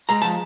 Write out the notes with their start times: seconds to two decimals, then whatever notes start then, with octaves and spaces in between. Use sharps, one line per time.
0.09 G#3 A#5
0.22 F3 A5